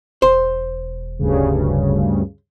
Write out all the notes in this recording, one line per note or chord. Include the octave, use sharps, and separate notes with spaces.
E1 C5
D2 G2 C#3